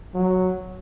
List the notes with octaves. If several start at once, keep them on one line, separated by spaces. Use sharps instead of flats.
F#3